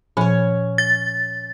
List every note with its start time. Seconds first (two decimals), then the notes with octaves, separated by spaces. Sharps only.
0.17 A#2 F3 C#4 C#5 G#5
0.78 A6